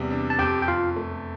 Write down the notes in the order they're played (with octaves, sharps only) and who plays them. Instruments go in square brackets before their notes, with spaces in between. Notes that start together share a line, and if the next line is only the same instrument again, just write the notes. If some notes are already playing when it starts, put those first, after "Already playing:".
Already playing: [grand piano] E2 C3 G3
D4
[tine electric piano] A5
[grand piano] F2 [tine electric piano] G4 G5
[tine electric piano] G5
[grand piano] F2 [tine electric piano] F4 F5
[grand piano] A3